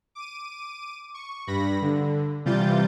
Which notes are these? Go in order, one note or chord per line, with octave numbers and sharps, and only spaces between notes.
D6 D#7
C#6
G2 B5 A#6
D3
C3 E3 G3 F4 G6 A6